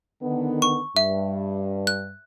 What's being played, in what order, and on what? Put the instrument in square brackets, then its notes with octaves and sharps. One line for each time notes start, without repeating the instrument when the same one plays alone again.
[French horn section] D3 D#3 B3
[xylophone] C#6
[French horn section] G2 [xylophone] E5
[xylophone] F#6